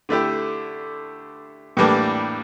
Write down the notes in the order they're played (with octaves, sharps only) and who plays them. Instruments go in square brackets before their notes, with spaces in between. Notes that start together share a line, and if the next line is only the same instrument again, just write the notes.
[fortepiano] D3 A3 E4 G4
A2 E3 G3 A#3 D4